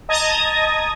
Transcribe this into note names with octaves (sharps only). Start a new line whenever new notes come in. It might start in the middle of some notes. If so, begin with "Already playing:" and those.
D#5 A5 A#5 D#6 G#6 A#6